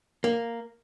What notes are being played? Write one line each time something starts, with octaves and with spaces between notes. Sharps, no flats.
A#3